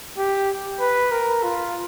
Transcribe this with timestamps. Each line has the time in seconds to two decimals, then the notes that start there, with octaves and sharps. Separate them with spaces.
0.18 G4
0.80 B4
1.12 A#4
1.43 F4